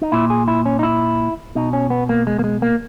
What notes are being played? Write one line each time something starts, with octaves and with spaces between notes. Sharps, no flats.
D#4
A#2 E4
G#4
E4
C#4
D#4
E4
B2 D#4
C#4
B3
A#3
G#3
A#3
G#3
A#3